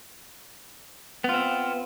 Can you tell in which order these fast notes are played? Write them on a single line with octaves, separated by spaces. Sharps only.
B3 F4 C4